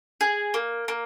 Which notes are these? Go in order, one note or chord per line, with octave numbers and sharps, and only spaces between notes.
G#4
A#3
A#3